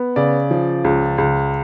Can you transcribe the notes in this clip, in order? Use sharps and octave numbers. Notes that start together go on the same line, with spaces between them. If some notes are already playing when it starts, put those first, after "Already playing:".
Already playing: B3
C#3 D5
F3
C#2
C#2